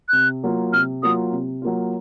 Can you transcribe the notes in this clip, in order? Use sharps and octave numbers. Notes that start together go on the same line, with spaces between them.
C3 F#6
F#3 A#3 F4
C3 F6
F#3 A#3 F4 D#6
C3
F#3 A#3 F4